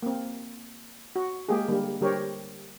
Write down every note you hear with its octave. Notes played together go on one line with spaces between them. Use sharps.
A#3 C4
F#4
G#3 A#3 G4 G#4
D3 G3 A#3
D3 G3 G4 A#4 C5 C#5